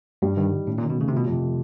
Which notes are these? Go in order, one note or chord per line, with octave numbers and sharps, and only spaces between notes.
G2 G3
G2 D#3
D#3
A2 C#4
A#2
D#3
B2
C#3 A3
C3
B2 F3
F2 C3
F3